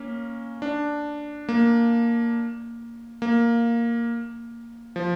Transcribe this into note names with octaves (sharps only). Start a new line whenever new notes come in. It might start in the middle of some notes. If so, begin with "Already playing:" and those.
Already playing: A#3 C#4
D4
A#3
A#3
F3